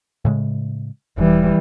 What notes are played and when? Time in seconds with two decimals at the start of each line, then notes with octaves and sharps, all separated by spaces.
0.25 A2 C#3 G#3
1.18 E1 E3 G3